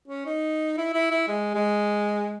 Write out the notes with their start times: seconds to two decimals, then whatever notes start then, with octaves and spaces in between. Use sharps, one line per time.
0.08 C#4
0.26 D#4
0.78 E4
0.94 E4
1.11 E4
1.28 G#3
1.55 G#3